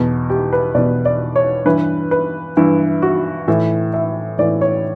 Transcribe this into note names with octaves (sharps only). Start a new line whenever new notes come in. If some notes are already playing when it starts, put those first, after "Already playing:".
Already playing: E2 B2
G4
B4
E2 B2 D5
D5
C#5
G2 E3 B4
B4
G2 E3 E4
F#4
A2 E3 E5
E5
A2 E3 D5
C#5